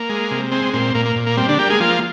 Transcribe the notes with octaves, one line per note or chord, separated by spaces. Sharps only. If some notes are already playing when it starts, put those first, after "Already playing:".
Already playing: A#3
G#3
C3
G#3 C4
A#2 C4
A#2 A#3
A#3
A#2
A#3
G3 C4
D3 D4
G3 A#3 G4
G#3 G#4
F3 A#3 F4